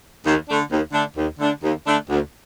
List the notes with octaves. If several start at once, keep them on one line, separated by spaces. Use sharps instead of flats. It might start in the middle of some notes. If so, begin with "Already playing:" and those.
D#2
D3 A3 D4
D#2
D3 A3 D4
D#2
D3 A3 D4
D#2
D3 A3 D4
D2